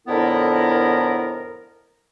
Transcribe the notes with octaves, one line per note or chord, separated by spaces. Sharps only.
F2 A2 D3 B3 E4 A#4